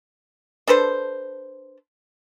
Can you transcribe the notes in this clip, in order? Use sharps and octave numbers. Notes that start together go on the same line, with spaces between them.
D4 A4 B4 C5